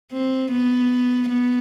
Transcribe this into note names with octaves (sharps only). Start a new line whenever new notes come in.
C4
B3
B3